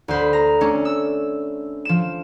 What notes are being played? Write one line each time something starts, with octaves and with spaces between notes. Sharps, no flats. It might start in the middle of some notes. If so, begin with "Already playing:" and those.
D2 C5 B5
A#5
A3 C#4 D4
E6
F3 E7